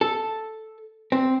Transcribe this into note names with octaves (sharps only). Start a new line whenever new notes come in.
A4
C4